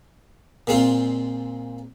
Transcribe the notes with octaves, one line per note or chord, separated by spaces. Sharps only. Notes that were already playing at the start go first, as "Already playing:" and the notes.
A#2 G#3 C4 F4